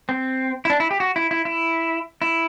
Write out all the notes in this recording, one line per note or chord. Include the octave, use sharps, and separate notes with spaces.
C4
E4
D4
E4
G4
F#4
E4
E4
E4
E4